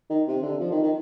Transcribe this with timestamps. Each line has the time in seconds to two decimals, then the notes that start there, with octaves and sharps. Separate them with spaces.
0.10 D#3
0.28 C3
0.43 D3
0.60 F3
0.72 D#3
0.83 D#3